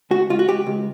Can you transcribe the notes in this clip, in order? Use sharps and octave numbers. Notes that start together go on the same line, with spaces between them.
C#2 F#4
C#2 F4
F#4
C#2 G4
C#2